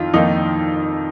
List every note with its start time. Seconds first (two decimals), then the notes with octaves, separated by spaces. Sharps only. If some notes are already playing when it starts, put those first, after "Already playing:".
Already playing: F2 D#3 F4
0.14 F2 D#3 A#3 D#4